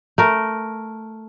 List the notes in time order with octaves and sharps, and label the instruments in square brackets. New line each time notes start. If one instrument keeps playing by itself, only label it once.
[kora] A3 A#4